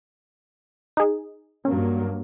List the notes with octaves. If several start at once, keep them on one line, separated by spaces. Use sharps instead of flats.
D#4 G#4
G2 F#3 A#3 C#4